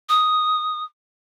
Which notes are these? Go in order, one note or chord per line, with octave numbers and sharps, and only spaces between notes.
D#6